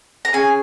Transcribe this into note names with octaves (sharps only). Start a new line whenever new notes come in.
A#5
C#4 G#4 G#5